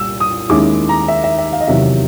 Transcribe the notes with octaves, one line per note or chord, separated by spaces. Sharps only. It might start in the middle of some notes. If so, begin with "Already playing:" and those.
Already playing: C2 A#2 G3 E6
D#6
D#2 D#3 G#3 C#4 E4 D6
A#5
E5
E5
E5
F5
D#5
E2 C3 D#3 F#3 E5